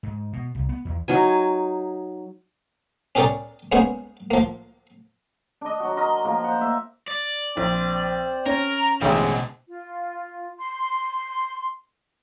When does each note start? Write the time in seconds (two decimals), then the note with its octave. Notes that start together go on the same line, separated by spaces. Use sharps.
0.03 G#2
0.33 B2
0.55 C2
0.69 B3
0.85 E2
1.08 F#3 D#4 G#5
3.15 C#4 G4 G#4 A#4 C#5 D5
3.72 G#3 A#3 B3 C#4 G#4 C5
4.31 F3 A#3
5.61 D4 D#5
5.80 F#3 F#4
5.97 A#4 D#5 C6
6.25 F3 A#3 A#4
6.44 C5 F#5
6.61 A#3 E5
7.08 D5
7.57 A#1 C4
8.46 C#4 A#4
9.02 A1 B2 D3 G#3 C4
9.67 F4
10.58 C6